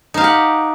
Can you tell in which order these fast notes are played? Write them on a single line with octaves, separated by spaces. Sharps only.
D#4 F5 G4 F#5